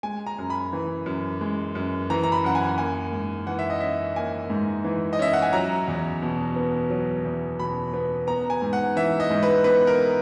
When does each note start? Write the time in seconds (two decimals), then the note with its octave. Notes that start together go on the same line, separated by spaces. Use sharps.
0.03 G#3 G#5
0.27 A#5
0.38 F#2
0.50 B5
0.73 E3
1.06 F#2
1.41 G#3
1.75 F#2
2.10 E3 A#5
2.23 A#5
2.32 B5
2.45 F#2 F#5
2.55 G#5
2.78 A#3 G#5
3.12 G#2
3.47 E3 F#5
3.59 E5
3.70 D#5
3.81 C#4 E5
4.16 A#3 G#5
4.50 G#2
4.84 E3
5.13 D#5
5.19 C#4 E5
5.33 F#5
5.42 G#5
5.53 F#3 A#5
5.88 E2
6.22 B2
6.56 B3
6.90 F#3
7.25 E2
7.59 B2 B5
7.94 B3
8.27 B3 A#5
8.50 G#5
8.62 G#2
8.73 F#5
8.96 E3 E5
9.20 D#5
9.30 G#2
9.43 B4
9.64 B3 B4
9.87 A#4